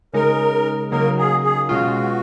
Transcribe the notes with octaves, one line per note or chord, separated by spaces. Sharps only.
C#3 G#3 D#4 A#4
C#3 F#3 A#3 D#4 A#4
G#4
G#4
B2 G#3 C#4 F4 F#4